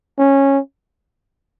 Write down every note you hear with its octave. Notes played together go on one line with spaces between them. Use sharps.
C#4